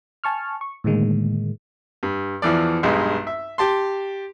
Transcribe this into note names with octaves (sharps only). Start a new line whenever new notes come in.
G#5 A5 C#6 F6
C#6
A2 D3 D#3 G#3 A#3
G2
E2 E3 F3 D5
B1 G2 G#3
E5
G4 A5 C6